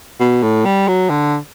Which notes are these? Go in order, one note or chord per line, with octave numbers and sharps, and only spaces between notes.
B2
A2
G3
F#3
D3